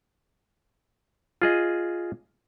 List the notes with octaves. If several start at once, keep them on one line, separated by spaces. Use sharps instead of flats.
F4 G#4 D#5